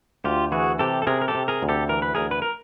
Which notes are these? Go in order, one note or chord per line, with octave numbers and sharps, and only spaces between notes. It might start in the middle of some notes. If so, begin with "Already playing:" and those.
D2 F4 G4
E3 F#4 G#4
C3 G4 A4
A4
C3 G#4 A#4
A#4
G4 A4
C3
G#4 A#4
D2
G4 A4
E3 A#4
B4
D2 G#4 A#4
B4
A#4